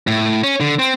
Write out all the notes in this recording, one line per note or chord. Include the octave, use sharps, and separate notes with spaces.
A2
C#4
D3
C4